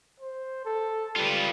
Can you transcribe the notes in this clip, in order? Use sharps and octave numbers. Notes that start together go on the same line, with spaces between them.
C5
A4
G3 F4 B4